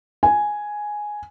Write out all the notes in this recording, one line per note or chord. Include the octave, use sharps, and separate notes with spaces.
G#5